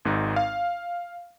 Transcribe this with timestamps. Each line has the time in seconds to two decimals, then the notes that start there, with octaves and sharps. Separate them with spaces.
0.05 G#1 G#2 D#4
0.36 F5